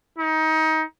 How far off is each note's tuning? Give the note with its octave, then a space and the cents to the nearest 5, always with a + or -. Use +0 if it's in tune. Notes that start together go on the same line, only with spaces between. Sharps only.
D#4 +25